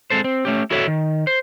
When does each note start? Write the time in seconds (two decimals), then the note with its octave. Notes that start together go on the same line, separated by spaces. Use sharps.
0.10 G#3 C4 A4 C5
0.24 C4
0.45 A3 C#4 G4
0.70 E4 F#4 A4 C#5 D#5 E5
0.87 D#3
1.27 C5